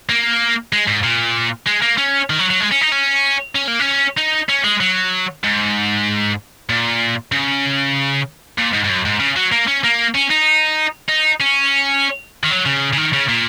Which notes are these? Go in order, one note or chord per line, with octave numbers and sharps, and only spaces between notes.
A#3
G#3
G#2
A#2
G#3
A#3
C#4
D#3
F#3
F#3
G#3
C#4
D#4
C#4
C#4
A#3
C#4
D#4
C#4
G#3
F#3
G#2
A#2
C#3
A#2
G#2
G#2
F#2
G#2
C#3
F#3
A#3
C#4
A#3
C#4
D#4
D#4
C#4
D#3
F#3
C#3
C#3
D#3
C#3
A#2